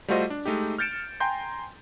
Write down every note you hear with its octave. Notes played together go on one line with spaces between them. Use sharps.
G3 A3 F4 F#4 C5 D#5
D4
G#3 A3 D#4 G4
F6 G6 A6 C#7 D7 E7
G5 G#5 A#5 C6 G6